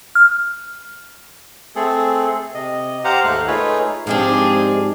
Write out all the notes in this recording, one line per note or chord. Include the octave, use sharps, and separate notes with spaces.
F6
A3 C4 G#4 A4
C3 D#5
G4 C5 F5 F#5 A#5
D#2 G#2 A3 F5 F#6
A3 D#4 F4 G#4 B4 C#5
G#2 F3 C4 D4 G4 G#4